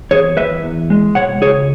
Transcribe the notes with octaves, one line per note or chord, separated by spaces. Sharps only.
E2 G#4 C#5
E2 B4 E5
E2
G#3
B2 C#5 F#5
C#2 G#4 C#5